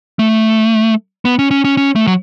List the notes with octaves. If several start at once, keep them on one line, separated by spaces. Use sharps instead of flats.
A3
B3
C#4
C#4
C#4
C#4
A3
F#3